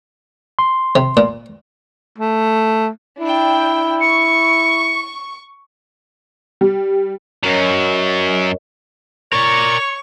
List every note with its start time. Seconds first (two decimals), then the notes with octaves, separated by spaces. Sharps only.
0.59 C6
0.96 C3
1.17 A#2
2.18 A3
3.20 D4 E4 G5
4.01 C#6 C#7
6.61 G3
7.43 F#2 F#3 A#4 C#5 D#5
9.33 A#4 C#5 D5 C#6